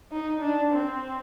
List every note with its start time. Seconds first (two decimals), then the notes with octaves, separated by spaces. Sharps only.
0.12 D#4
0.41 D4
0.71 C4